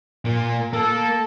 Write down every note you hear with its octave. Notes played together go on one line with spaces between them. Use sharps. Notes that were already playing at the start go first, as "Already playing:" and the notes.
A#2 A#3
A#3 A4